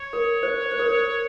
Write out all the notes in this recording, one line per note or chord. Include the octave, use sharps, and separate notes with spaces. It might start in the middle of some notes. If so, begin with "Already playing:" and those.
Already playing: C#5
A#4
C5
C5
A#4
C5